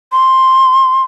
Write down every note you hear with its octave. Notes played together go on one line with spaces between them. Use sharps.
C6